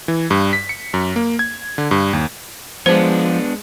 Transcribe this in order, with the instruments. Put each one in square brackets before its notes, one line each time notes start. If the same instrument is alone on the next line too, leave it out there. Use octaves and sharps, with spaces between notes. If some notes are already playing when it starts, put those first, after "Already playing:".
[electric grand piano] E3
G2
B6
C#7
F#2
A#3
G#6
D3
G2
D#2
[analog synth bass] F3 [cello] G#3 [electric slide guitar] B3 D4 [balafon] C5